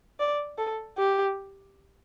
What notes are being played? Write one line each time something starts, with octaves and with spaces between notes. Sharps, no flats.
D5
A4
G4